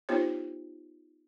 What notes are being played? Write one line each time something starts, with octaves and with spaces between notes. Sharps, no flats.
B3 D#4 F4 G4 C5 C#5